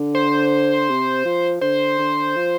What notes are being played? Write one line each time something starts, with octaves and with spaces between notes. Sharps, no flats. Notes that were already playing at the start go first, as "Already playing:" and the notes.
Already playing: D3
C5
C3
F3
D3 C5
D3
F3